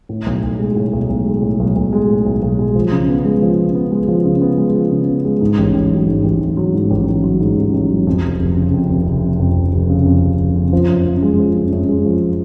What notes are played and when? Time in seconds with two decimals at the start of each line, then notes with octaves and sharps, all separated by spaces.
0.09 A2
0.26 B1
0.43 B1
0.59 G#3
0.76 A2
0.93 B1
1.09 B1
1.26 G#3
1.43 A2
1.59 B1
1.76 B1
1.93 G#3
2.09 A2
2.26 B1
2.42 B1
2.59 G#3
2.75 F3
2.92 C#3
3.08 B3
3.25 G#3
3.42 F3
3.59 C#3
3.75 B3
3.92 G#3
4.08 F3
4.25 C#3
4.41 B3
4.58 G#3
4.75 F3
4.91 C#3
5.07 B3
5.25 G#3
5.41 G#2
5.58 A1
5.74 A1
5.91 F#3
6.07 G#2
6.24 A1
6.41 A1
6.57 F#3
6.74 G#2
6.91 A1
7.07 A1
7.24 F#3
7.40 G#2
7.57 A1
7.74 A1
7.90 F#3
8.07 F2
8.24 F1
8.40 F1
8.57 C#3
8.74 F2
8.90 F1
9.07 F1
9.23 C#3
9.39 F2
9.56 F1
9.73 F1
9.90 C#3
10.06 F2
10.23 F1
10.39 F1
10.56 C#3
10.73 F3
10.89 F#2
11.06 F#2
11.22 G#3
11.39 F3
11.56 F#2
11.72 F#2
11.89 G#3
12.05 F3